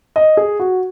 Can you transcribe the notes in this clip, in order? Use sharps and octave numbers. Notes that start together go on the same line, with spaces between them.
D#5
G#4
F#4